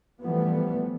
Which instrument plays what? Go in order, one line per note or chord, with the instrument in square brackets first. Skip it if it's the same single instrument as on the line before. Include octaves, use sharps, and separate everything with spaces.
[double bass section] E3 F3 G3 A3 B3